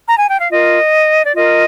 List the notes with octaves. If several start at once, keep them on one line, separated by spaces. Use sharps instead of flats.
A#5
G#5
G5
F5
F4 A#4 D#5
D5
F4 A#4 D#5